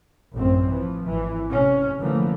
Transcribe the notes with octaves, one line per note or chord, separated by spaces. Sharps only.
A1 F#2 C4
E3 F3
G#1 E3
C3 C#4
D3 E3 F3 A3 A#3